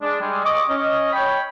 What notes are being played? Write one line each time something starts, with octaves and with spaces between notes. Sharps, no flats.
G#3 D4
G3 G#3
D#5 C#6 D6
C#4 D#5
C#5 G5 B5